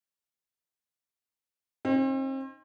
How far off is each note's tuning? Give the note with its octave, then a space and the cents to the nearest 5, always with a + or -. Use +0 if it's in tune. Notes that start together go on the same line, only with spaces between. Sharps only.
C4 +40 D#4 +0